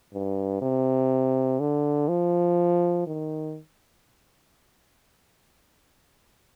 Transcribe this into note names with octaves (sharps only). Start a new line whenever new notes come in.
G2
C3
D3
F3
D#3